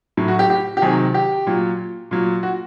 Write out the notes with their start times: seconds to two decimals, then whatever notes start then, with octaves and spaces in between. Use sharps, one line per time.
0.17 A2 F#3
0.28 F#4
0.39 G4
0.50 G4
0.77 G4
0.82 C3 D#3 F#3 G#4
1.14 G4
1.47 A#2 F#3
2.11 A#2 F#3
2.43 F#4